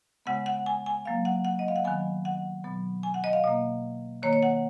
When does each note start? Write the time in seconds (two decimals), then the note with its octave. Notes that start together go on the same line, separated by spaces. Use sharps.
0.26 C#3 G#3 B3 F#5
0.46 F#5
0.66 G#5
0.86 G#5
1.05 C#3 F#3 A#3 F5
1.25 F#5
1.45 F#5
1.59 D#5
1.68 F5
1.76 F#5
1.84 D#3 F#3 B3 G#5
2.25 F#5
2.64 B2 F#3 B3
3.03 G#5
3.14 F#5
3.24 D#5
3.33 F5
3.44 B2 A#3 D#5
4.23 D#3 A#3 C#5
4.33 C#5
4.43 F#5